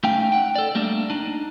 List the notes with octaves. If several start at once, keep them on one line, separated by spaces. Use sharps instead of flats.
A3 C#4 D#4 F5 G5
F#5 G5
A4 D5
G3 A3 A#3 D4
D4 D#4